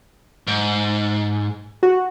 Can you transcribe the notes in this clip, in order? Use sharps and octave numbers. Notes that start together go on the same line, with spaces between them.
G#2
F#4